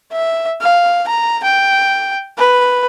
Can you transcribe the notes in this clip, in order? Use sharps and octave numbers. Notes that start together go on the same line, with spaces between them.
E5
F5
A#5
G5
B4